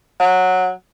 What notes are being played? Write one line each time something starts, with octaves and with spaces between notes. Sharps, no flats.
F#3